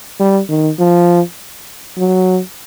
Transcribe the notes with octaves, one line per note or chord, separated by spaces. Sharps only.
G3
D#3
F3
F#3